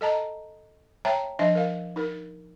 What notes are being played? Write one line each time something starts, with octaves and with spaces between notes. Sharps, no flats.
A4 D#5 A5 A#5
C#5 E5 G5 A5 A#5
F3 D4 D#5 E5
A#4 F5
D#4 A#4